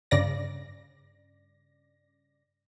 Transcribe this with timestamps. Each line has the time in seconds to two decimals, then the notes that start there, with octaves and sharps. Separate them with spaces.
0.11 G2 C#3 D5 A#6